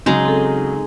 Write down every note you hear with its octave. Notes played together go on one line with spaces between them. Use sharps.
C#3 F#3 G#3 D#4
C4 A4